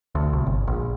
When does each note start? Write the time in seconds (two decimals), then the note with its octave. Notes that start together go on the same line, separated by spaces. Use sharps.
0.15 D2
0.33 C2
0.46 G1
0.67 A#1